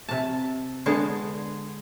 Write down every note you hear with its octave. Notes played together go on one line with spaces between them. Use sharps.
C3 A5
D3 G#3 B3 G#4 A5